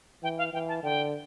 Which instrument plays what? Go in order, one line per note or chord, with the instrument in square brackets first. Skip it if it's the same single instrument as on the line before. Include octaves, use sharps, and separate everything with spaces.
[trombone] E3 [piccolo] G5
[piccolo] F5
[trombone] E3 [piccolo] G5
[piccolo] A5
[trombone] D3 [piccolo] G5